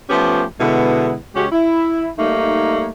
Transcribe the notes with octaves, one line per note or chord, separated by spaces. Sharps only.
F3 A3 B3 C#4 G4
B2 D3 G#3 B3 E4
C#3 G#3 C#4 F#4 G4
E4
G3 A3 A#3 D#4